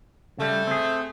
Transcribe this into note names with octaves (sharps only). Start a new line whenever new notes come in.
C#3 G3 A3
C4 G#4